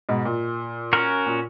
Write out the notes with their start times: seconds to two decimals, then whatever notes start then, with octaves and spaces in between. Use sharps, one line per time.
0.09 G#2 B2
0.25 A#2
0.93 C#4 F#4 A#4
1.26 A#2